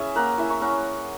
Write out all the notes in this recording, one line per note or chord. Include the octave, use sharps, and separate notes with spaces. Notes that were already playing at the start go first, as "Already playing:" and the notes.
Already playing: C#4 E4 G#4 E5 G#5
A#3 F#5 A#5
E4 E5 G#5
A#5 C#6
C#4 F#5 A#5